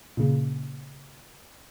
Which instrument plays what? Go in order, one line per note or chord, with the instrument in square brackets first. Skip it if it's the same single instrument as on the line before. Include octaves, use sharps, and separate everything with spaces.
[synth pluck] A#2 C#3